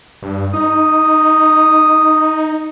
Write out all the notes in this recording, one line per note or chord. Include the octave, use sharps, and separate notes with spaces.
G2
D#4 D#6